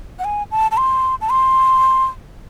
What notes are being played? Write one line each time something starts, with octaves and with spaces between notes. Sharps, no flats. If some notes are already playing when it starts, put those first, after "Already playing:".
F#5
G#5
A5
A5
C6
A5
C6